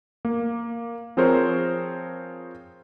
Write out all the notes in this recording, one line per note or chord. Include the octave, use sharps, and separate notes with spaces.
A#3
F3 C4 G#4 A#4 C5 C#5